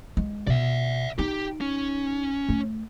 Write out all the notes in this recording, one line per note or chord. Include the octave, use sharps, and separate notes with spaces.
G#3
B2 D5 E5
D#4 G4
C#4
A3